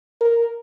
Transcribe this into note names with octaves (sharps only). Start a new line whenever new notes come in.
A#4